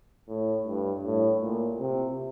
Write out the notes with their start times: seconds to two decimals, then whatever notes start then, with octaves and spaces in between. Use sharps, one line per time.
0.28 A2
0.66 G2
1.03 A2
1.41 A#2
1.79 C3